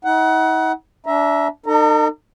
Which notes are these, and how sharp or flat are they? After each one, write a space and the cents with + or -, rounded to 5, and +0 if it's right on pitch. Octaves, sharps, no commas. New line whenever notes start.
D#4 +45 F#5 +20
D4 -20 E5 +0 A#5 +25
D#4 -35 A4 +45 A#5 -10